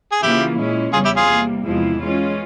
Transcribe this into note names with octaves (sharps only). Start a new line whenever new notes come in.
G#4
C#3 E3 A#3 E4 F4 G4
A#2 G#3 C#4 E4
E2 C#3 E3 G3 C#4 F4 G#4
E4 G4
F4 G#4
C3 G3 A#3
E2 C3 F3 G#3 E4
E3 G#3 C#4 F4